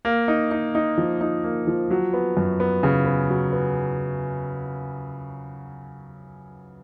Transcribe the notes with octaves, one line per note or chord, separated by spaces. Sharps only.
A#3
D#4
D#4
D#4
F3
D#4
A#3
F3
F#3
B3
F#2
B3
C#3
B3
F#3
B3